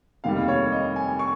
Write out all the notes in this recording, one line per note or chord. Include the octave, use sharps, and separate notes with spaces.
F1 D#2 D#3 G3 F5
C#5
D#5
G#5
C#6